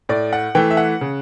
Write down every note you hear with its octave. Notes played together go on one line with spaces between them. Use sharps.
A2 D5
F#5
E3 A3 G5
E5
F#5
C#3